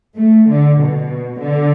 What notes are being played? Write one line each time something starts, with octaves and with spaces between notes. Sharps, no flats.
A3
D3
B2
D3